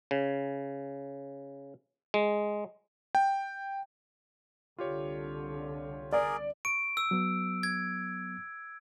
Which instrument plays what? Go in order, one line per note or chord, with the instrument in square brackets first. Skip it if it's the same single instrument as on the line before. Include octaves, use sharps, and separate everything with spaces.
[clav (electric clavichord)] C#3
G#3
[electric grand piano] G5
[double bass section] C2 D3 [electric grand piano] F4 G4 C#5
[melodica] G#4 A#4 [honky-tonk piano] D5
[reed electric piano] C#6 [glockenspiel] D7
[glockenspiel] E6
[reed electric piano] F#3 B3
[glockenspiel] G#6